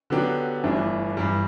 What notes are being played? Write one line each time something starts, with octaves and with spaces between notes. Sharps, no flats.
D3 F#3 B3 D4 G4
G1 G2 E3 A3 D4
G2 E3 G3